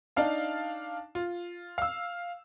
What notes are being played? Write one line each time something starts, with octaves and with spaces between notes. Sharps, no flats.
D4 D#4 F5 A5
F4
F5 E6